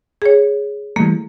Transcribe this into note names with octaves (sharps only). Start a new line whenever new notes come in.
G#4 C#5
E3 G3 A3 A#3